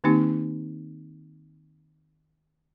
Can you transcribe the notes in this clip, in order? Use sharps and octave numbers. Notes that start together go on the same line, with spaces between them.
D#3 A#3 C4 D#4 G4